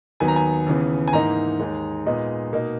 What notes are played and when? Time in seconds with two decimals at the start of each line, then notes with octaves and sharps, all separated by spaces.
0.20 D#2 D#3 F#3 B3 G#5
0.28 A#5
0.36 G#5
0.66 D#2 C#3 E3 B3
1.08 G#5
1.13 G#2 E3 A#3 D#4 A#5
1.60 D#2 D#3 G#3
2.06 A#2 G#3 B3 D#4
2.53 B2 A#3 D#4